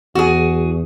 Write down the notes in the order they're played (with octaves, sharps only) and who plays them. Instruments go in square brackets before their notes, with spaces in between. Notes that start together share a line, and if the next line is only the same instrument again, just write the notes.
[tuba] E2 [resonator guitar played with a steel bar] F#4 G#4